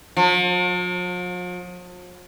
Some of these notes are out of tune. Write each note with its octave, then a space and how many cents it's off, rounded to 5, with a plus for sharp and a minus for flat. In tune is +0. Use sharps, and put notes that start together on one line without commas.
F3 +45